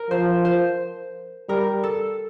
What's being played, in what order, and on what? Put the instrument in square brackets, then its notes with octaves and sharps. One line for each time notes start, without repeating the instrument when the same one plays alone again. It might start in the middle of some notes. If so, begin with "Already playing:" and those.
Already playing: [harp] A#4
[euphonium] F3 [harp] C5
[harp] C5
[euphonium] G3 [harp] A#4
[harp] A4